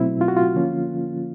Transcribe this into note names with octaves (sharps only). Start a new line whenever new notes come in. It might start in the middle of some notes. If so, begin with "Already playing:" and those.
Already playing: B2 F#3 A3 C4 E4
F4
F#4
F4
D3 F3 A#3 C#4